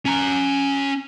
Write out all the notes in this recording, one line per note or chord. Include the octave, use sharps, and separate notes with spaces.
C#4 A#5